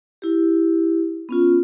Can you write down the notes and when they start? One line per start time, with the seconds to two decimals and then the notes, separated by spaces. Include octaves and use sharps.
0.22 E4 G4
1.29 B3 C#4 F4